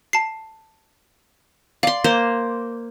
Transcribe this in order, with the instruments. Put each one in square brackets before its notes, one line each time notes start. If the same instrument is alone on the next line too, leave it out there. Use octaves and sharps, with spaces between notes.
[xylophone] A5 C7
[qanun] D5 C6 [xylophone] F5
[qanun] A#3 C5